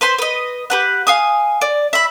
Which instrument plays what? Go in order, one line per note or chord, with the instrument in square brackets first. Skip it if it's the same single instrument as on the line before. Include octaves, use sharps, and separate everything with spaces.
[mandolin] B4 C5 C6
B4 D#5
G4 B4 F#5
F5 G#5 D#6
D5
E5 B5